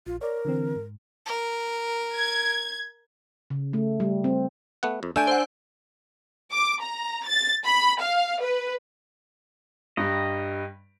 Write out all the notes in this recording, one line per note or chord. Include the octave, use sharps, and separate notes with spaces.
A#1 F4
A#4 C#5 D5
D3 E3 C4
G#2
A#4
G#6
C#3
A3
G3
C4
A3 B3 F#5
F2
A3 D4 G#5 E6 G6 D7
C5 F#5
D6
A#5
A6
B5
F5
B4
G2 G3 D#5 A#5